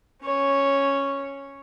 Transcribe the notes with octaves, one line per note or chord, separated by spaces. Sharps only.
C#4 C#5